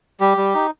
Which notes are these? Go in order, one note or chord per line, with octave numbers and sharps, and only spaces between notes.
G3 G4
G3
D#4